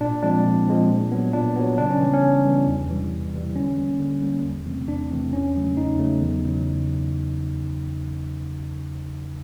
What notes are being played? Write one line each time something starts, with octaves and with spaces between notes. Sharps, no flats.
A#2 D4
F3 G#3 C4 D4
A#2
F3 G#3 C4
A#2
F#3 B3
A#2 D4
F#3 B3
C#3 D4
C#4
E3 G3 B3
C#4
C#3
E3 G3 B3
E2
C3 E3 G3
E2
C3 E3 G3
D3 C#4
G3 A#3 C#4
D3
G3 A#3 C#4
E2
C3 E3 A3 C4
E2 D4
C3 E3 A3 C4
E2 C#4
C#3 F#3 A3
E2 D#4
C#3 F#3 A3
E2
C#3 F#3